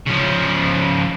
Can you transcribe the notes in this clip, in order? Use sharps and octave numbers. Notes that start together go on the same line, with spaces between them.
C#3 F3